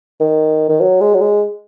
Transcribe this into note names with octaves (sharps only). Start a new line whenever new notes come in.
D#3
D#3
F#3
G#3
F#3
G#3